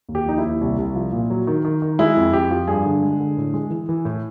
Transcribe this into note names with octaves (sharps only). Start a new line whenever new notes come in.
D#2
G4
F3 D#4
E4
D#2
C2
C2
F3
A#2
F#3
D#3
D#3
D#3
G#3 E4
F2
F2 G4
F3
G2 G#4
D3
G#3
D3
A2
G#3
E3
E3
A2